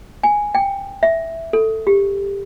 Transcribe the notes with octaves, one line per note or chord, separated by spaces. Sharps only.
G#5
G5
E5
A4
G4